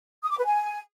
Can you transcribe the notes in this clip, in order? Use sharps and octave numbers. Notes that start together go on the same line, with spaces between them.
D#6
D6
B4
G#5